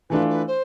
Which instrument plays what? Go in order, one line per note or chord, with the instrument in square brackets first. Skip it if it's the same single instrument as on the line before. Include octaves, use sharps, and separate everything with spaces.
[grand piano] E3 A3 D4 F4 [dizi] B4
[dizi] B4
C5